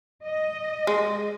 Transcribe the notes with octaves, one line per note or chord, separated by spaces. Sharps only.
D#5
G#3